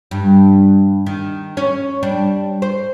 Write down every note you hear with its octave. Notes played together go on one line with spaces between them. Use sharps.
G2
D#3
C#4
G3 D4
C5